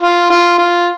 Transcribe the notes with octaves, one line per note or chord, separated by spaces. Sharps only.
F4
F4
F4